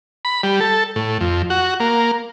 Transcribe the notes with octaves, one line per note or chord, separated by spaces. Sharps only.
B5
G3
A4
A2
F2
F#4
A#3